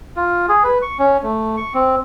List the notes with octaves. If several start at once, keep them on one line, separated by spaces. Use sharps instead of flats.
F4
G#4
B4
C#6
C#4
A3
C#6
C4